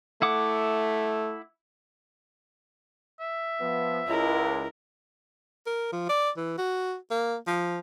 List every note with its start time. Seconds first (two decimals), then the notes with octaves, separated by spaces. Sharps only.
0.22 A3 E4 F#5 D6
3.20 E5
3.61 F3 B3
4.07 C#2 E4 A#4
5.66 A#4
5.92 F3
6.09 D5
6.37 E3
6.58 F#4
7.10 A#3
7.47 F3